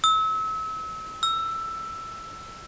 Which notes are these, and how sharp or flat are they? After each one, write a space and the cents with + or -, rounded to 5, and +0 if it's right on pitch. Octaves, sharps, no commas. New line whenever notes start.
E6 -30
E6 +10